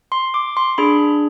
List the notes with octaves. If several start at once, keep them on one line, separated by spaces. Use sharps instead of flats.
C6
D6
C6
D4 G#4 B5